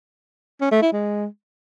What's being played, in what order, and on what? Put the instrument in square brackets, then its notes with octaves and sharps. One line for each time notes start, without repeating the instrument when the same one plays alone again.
[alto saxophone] C#4
A3
E4
G#3